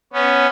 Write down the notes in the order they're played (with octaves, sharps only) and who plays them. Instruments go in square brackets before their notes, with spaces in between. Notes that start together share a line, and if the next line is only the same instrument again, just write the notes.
[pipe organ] B3 C#4